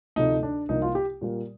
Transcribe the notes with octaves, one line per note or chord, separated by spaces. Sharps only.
D2 C3 F3 A3 D#4
D4
C2 C3 F3 A#3 D#4
F4
G4
A#2 G3 A#3